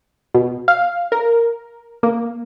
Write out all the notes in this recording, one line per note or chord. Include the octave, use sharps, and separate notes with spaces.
B2
F5
A#4
A#3